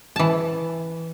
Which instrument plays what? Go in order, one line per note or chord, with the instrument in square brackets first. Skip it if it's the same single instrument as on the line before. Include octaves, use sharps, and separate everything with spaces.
[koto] E3 A5